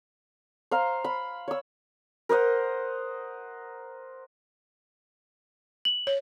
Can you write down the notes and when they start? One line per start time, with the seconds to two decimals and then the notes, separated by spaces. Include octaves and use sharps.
0.71 C5 F5 A#5
1.04 B5
1.48 C#5 E6
2.29 A#4 C5 D#5 F#5
5.85 F#7
6.07 C#5